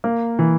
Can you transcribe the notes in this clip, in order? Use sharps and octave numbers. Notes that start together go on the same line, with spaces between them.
A#3
E3